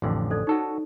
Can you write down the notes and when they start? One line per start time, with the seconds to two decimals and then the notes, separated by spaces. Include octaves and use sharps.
0.02 A1 F2 D3 C#4 C6
0.30 A4 C5 D5
0.47 D#4 F#4 A4 C#5 A5